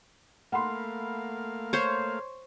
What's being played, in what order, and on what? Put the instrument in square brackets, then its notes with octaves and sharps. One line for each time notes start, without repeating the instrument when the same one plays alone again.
[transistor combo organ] A3 A#3 F5 [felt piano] F#5 B5 C6
[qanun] C5 C#5